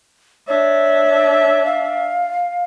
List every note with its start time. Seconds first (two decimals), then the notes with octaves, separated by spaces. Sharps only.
0.48 D4 C#5 E5
1.65 F5